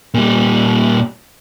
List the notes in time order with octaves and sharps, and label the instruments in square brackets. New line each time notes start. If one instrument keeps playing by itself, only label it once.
[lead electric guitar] A#2 G3